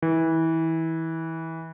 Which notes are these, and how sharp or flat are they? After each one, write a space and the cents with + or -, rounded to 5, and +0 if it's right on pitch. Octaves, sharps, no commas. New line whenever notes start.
E3 -25